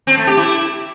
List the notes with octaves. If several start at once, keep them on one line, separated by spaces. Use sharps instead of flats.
C4
A3
G4
E4